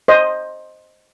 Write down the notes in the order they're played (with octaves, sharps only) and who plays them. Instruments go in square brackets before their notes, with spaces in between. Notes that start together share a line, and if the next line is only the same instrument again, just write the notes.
[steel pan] C5 D#5